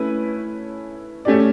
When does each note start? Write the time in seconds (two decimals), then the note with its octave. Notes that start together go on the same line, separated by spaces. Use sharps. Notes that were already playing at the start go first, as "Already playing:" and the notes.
Already playing: A3 C#4 E4 B4
1.25 A3 C#4 G4 D5